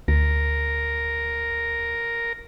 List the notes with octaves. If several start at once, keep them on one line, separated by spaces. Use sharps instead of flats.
D2 A#4